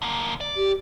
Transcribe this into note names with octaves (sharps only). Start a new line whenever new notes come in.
D3 A#3
D5
G4